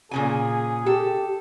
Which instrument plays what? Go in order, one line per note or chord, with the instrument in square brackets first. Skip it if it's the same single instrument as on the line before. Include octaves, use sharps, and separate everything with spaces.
[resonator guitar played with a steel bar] A#2 C#3 G#5 [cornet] G#4
[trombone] G4 [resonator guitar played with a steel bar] A4